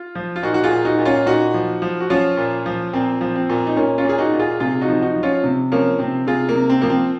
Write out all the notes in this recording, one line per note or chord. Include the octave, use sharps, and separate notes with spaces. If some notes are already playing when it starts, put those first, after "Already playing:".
Already playing: F4
F3
F4
A#2 D#4 F#4
F#4
F4 G#4
A#2
D#4 F#4
A#2
C#4 F4
A#2 D#4 F#4
F3
F3
F#4
F3 C#4 F4
A#2
F3
A#2 C4
F3
C4
A#2
D#4
A#2 A#3 C#4
C#4 F4
A#2 G#4
D#4 F#4
A#2
F4 G#4
C3 F4 G#4
D#4 F#4
F3
D#4 F#4
F3
C#4 F4
C3
F3 A#3 C#4
C3 C4
C3 F4 G#4
A#3
C3
C4
F3 A#3
C4